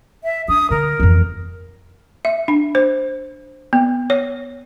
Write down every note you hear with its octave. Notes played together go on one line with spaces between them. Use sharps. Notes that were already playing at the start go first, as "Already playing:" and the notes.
E5
D4 D#6
D3 A#4
F2 E3
E5
D4
C5
B3
C#5